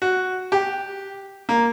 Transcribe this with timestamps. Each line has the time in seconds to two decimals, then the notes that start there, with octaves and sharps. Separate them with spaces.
0.02 F#4
0.52 G4
1.49 A#3